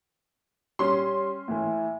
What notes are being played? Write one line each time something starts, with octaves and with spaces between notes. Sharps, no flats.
G3 C#4 C6
A2 E3